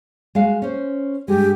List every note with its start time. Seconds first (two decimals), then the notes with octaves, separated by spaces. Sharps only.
0.35 G#3 F#4 F5
0.62 C#4 C5
1.28 G2 G#3 G4